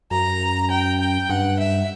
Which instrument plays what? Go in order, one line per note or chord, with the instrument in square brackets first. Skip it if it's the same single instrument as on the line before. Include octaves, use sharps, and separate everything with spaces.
[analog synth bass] F#2 [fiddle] A#5
[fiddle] G5
G5
[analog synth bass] G2 [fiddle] F#5
[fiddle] E5